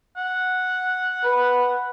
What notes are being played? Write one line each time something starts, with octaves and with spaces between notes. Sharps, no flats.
F#5
B4